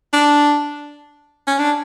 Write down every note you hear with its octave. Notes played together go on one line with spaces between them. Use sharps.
D4
C#4
D4